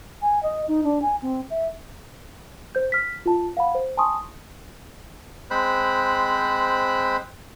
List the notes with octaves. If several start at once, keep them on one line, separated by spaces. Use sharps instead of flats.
G#5
D#5
D#4
D4
G#5
C4
E5
C5 G6
F6 B6
F4 A5
F5 F#5 B5
C5
G#5 A5 C6 C#6 D#6
G#3 C4 C5 B5 F#6